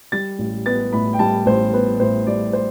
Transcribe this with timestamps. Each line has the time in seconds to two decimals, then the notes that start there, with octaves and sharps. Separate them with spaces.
0.12 G3 A6
0.39 A1
0.66 B3 A6
0.93 A2 B5
1.13 G5
1.19 G3 A5
1.46 A1 C5
1.73 B3 B4
2.00 A2 C5
2.27 G3 D5
2.53 C5